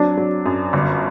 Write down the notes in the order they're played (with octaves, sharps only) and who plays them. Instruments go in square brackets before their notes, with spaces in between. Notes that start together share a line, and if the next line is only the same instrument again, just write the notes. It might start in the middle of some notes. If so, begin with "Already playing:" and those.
Already playing: [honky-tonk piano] F#3 C4 [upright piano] D4 D5
[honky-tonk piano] F#3
F#2
G1